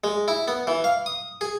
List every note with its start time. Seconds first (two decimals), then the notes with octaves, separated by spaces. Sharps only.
0.04 G#3
0.28 E4
0.48 B3
0.67 E3
0.84 F5
1.06 D#6
1.41 G#4